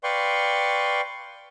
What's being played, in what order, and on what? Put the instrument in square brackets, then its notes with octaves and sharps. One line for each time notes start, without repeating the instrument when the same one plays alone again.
[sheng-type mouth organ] B4 D5 F5 G5 C6 C#6